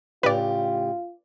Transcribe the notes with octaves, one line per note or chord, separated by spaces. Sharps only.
A2 C#3 F4 G4 B4 D5